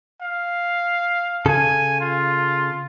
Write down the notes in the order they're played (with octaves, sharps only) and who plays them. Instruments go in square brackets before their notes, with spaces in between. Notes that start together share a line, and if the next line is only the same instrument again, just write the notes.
[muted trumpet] F5
[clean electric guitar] C#3 A4 [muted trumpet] G#5
[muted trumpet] F4